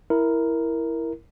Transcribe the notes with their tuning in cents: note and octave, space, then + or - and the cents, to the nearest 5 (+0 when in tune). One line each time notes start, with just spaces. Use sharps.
E4 +0 A#4 +0